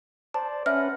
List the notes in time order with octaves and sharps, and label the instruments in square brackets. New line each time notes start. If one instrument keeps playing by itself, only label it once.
[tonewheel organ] C5 D5 [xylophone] A5
[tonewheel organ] C#4 B4 F#5 [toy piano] E5 G#5 [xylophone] F6